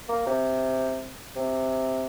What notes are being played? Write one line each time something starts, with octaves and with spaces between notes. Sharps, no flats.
A#3
C3
C3